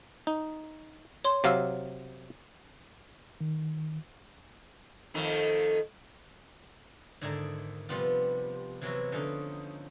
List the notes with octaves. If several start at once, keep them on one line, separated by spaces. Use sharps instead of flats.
D#4
C#5 C6
C3 F#3 F5 D6 E6
D#3
F2 D#3 A3
G#2 D3 D#3 D4 E4 A#5
C3 F3 G3 B3 F4
C3 E3 F#3 B3 E4 F#4
D3 F3 C#4 D#4